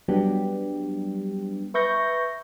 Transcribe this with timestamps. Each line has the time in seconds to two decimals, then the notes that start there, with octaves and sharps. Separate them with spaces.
0.08 F#3 G3 B3 D4 G4
1.74 B4 E5 C#6 G6 A#6